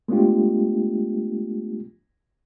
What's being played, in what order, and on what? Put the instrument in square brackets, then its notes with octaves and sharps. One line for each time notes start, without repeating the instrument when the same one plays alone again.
[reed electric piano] G#3 A3 B3 D4 F4 G4